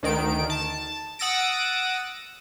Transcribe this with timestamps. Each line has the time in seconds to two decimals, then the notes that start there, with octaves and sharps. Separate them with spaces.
0.03 D2 D#3 D7
0.50 A5
1.19 F#5 D#6 E6 A6 A#6 D7